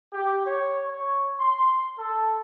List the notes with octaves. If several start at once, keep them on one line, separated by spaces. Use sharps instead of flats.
G4
C#5
C#5
C6
A4